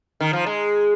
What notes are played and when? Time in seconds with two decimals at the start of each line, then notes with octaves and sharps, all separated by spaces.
0.21 D#3
0.33 F3
0.46 G#3